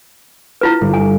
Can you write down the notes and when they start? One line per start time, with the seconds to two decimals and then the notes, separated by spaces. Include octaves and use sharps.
0.61 E4 F4 B4
0.81 G1
0.94 G#5